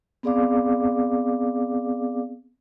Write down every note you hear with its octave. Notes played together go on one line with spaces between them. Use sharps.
B3 C4 G#4 D5 F5 D6